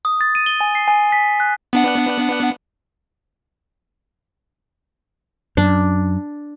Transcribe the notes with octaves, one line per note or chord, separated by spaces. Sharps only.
D#6
A6
D#7
G7
G#5
C7
G#5
B6
F#6
B3 D4 F#5
F#2 D4